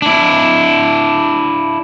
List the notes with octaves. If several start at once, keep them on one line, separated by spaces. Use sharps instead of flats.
D4 E4